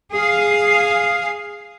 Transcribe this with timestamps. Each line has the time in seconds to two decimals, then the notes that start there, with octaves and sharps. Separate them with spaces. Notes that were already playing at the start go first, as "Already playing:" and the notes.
0.15 G#4 F5